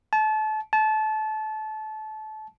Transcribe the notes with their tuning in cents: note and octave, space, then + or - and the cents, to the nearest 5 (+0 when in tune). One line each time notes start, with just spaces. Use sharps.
A5 -30
A5 -25